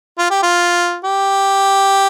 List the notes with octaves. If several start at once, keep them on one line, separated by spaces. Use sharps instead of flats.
F4
G4
F4
G4